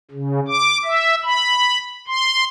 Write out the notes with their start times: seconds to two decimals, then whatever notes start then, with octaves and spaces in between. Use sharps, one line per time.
0.11 C#3
0.48 D6
0.84 E5
1.24 B5
2.07 C6